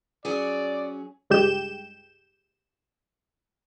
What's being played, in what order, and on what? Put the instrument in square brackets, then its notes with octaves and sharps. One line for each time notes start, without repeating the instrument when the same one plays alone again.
[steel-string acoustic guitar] F#3 C#4 G#4 [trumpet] D5
[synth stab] C#2 G2 G#3 G4 G6 E7